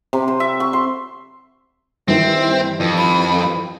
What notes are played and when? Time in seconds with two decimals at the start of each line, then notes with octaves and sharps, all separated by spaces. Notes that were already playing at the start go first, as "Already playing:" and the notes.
0.13 C3
0.28 C5
0.40 E5
0.60 C#6
0.73 C6
2.08 G2 D#3 E3 C4 E5
2.80 F2
2.97 B5